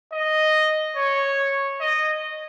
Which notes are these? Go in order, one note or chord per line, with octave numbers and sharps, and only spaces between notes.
D#5
C#5
D#5